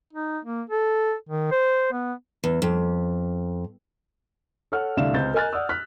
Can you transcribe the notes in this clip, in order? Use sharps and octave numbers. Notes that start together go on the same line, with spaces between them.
D#4
A#3
A4
D#3
C5
B3
E2
F2
A4 C#5 F#5 F6
C2 D3 A3 D5 F5 E7
C#2 C4 G6 A6
A#4 D#5 G#5 F6 F#6 A6
D5 F#5 D#6 E6
F6 F#6 B6